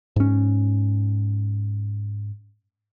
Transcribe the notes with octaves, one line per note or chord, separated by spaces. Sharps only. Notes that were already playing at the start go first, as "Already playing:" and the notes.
G#2 C#4